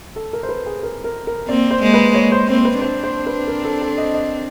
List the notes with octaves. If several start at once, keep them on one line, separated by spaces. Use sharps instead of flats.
A4
A#4
C5
B4
G#4
A#4
A#4
A#4
A#3 C4 D5
C5
G#3 A#3
B4
C#5
C5
A#3 C4 C5
B4
C4 D4 C5
C5
B4
A#4
A4
A4
D#5
D#5